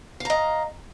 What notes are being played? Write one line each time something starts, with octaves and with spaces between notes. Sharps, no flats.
D#5 F5 A#5